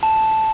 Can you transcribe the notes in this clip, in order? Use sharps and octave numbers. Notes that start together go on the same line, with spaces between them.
A5